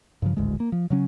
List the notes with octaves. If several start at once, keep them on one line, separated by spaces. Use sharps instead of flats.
G2 C#3 F3
D1 G#1 D2 G#3
A#3
F3
C#3 F#3 C#4